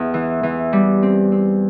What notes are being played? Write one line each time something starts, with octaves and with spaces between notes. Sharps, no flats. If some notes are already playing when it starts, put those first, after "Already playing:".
Already playing: E2
E3
E3
G3
C4
C4